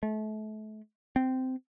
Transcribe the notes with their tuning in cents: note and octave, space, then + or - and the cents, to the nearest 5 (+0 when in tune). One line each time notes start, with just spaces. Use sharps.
A3 -35
C4 -15